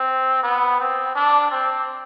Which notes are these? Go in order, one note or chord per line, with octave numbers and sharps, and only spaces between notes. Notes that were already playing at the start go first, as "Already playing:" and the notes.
Already playing: C4
B3
C4
D4
C4